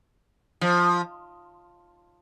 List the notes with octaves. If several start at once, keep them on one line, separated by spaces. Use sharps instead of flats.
F3